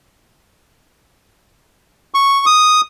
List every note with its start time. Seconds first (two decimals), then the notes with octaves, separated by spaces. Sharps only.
2.14 C#6
2.46 D#6